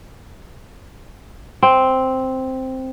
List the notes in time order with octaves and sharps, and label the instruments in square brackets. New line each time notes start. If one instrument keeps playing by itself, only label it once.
[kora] C4